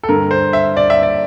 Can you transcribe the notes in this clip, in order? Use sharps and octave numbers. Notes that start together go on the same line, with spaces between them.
A4
G2 D3 A#4
C5
E5
D5
E5
D5